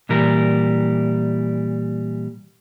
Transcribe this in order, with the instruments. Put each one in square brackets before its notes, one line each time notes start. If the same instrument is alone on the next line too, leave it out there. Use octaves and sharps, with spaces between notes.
[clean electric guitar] A#2 E3 G3 A#4